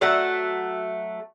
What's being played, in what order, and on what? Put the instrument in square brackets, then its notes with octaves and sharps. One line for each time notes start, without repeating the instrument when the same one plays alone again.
[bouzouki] F#3 A3 E5 F#5